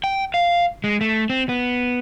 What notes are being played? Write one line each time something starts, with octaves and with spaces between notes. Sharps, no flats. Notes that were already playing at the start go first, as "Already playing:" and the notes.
G5
F5
G#3
A3
C4
B3